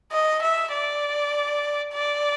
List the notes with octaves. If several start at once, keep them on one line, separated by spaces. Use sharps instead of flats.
D#5
E5
D5
D5